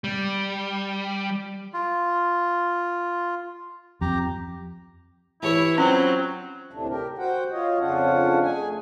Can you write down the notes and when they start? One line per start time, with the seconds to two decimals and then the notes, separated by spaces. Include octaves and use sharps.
0.04 G3
1.74 F4
4.01 F2 G4 A#5
5.43 E3 E4 G4 B4 C#5
5.78 F#3 C4 C#4 F4
6.71 D2 A2 C3 A3 D4
6.89 G4 A#4
7.19 F#4 C5 F#5 G5
7.52 F4 C#5 D#5
7.79 F2 C#3 C#4 D4 F4 F#5
8.42 A3 G#4 G#5